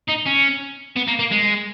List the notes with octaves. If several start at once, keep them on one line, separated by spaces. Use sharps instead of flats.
D#4
C#4
B3
A#3
A#3
G#3